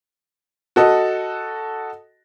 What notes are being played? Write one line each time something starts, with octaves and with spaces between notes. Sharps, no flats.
F#4 A4 D#5